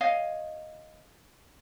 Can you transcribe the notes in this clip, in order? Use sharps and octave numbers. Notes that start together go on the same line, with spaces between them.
C#5 D#5 F5